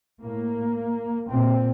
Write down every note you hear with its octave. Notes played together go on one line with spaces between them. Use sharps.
A2 A#3
A#2 C4